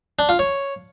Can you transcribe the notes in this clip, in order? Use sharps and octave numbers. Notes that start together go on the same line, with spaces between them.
D4
F4
C#5